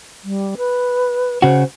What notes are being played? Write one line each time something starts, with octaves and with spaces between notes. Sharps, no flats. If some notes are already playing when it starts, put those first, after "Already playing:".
G3
B4
C#3 F#4 C5